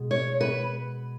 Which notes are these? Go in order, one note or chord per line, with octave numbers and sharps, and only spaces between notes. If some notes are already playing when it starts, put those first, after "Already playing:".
Already playing: B2 G#3
C#5
B4